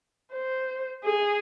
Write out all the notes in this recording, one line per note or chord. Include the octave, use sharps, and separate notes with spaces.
C5
G#4